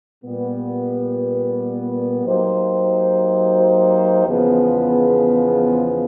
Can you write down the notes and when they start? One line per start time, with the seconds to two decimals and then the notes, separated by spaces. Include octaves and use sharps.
0.24 A#2 G3 B3
2.25 F#3 A#3 D#4 G4 C5
4.27 E2 C#3 F3 G#3 B3